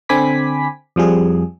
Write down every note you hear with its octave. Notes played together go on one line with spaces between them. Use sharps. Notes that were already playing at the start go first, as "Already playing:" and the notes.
D3 C4 G#5 B5 D6 B6
F2 F3 G3 G#4